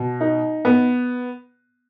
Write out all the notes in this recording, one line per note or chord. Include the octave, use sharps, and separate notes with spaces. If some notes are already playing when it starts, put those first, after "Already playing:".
Already playing: B2
D#4
B3